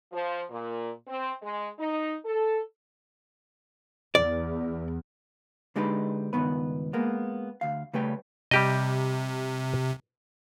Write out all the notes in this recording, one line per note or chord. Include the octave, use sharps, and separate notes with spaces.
F3
A#2
C4
G#3
D#4
A4
E2 D5
D3 G#3 D#4 G4 B4
C#2 G2 D#3 B3 B4
G#3 A#3 B3
D2 F5
C#3 G3 A3 B4 C#5 G5
C3 G3 G4 D#5